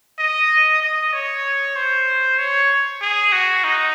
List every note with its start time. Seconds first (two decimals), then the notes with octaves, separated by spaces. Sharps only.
0.19 D#5
0.82 D#5
1.13 C#5
1.76 C5
2.38 C#5
3.01 G#4
3.32 F#4
3.64 D#4